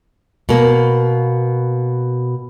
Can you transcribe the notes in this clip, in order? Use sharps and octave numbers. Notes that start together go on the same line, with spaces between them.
B2 A#3